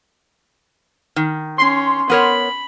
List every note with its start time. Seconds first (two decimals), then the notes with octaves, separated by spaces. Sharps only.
1.16 D#3
1.58 C#4 C6
2.10 B3 A#4 C#5 B5